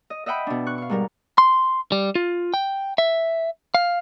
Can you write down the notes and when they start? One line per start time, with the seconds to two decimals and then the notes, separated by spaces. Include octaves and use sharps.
0.10 D#5
0.26 D#5 E5 F#5 G5 B5
0.47 B2 D4
0.67 C#6 F#6
0.78 F5 C#6
0.89 G#2 G3 A#4
1.38 C6
1.92 G3
2.15 F4
2.54 G5
2.98 E5
3.75 F5